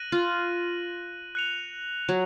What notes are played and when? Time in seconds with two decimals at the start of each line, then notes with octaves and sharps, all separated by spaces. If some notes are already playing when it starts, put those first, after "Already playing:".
Already playing: F#6 A#6 D#7 F#7
0.12 F4
1.35 F#6 C#7 F7
2.09 F#3